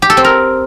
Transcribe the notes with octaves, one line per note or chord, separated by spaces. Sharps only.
G4
A4
C4
A#4